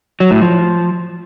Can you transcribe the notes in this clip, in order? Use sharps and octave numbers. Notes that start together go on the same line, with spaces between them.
F#3
A2
F3